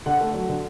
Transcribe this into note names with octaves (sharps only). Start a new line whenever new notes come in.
D3 F#5
A3
F#3
D3